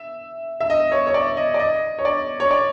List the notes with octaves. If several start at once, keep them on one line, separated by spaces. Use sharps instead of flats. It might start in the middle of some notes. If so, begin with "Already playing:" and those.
Already playing: E5
E5
D#5
C#5
C#5
D5
D#5
D5
D#5
C#5
D5
C#5
D5